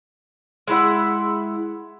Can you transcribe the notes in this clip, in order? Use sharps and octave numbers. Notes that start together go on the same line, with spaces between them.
G#3 E4 F#5